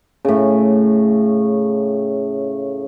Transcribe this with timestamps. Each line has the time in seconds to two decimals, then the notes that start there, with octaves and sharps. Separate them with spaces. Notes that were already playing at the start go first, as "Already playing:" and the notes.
0.25 A2 C#3